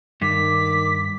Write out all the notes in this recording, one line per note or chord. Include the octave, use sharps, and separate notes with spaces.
G2 D#3 D6 B6